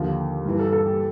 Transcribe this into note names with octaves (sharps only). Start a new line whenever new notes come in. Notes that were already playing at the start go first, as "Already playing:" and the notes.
Already playing: D#2 D3 F3
G2 E3
A4
A4
G4